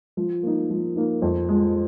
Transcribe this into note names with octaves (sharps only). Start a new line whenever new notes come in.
F3
A#3 D#4
F3
A#3 D#4
F2
F3 G#3